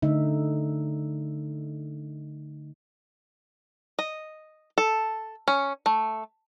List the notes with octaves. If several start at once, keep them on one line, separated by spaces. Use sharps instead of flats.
D3 A3 D#4 E5
D#5
A4
C#4
A3